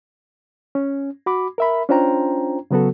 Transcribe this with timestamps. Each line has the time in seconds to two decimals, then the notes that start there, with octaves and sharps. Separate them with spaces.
0.75 C#4
1.26 F#4 B5 D6
1.58 A#4 E5 B5
1.89 C#4 D4 F4 C5 G5 A#5
2.71 C#3 F#3 B3 F#4 A4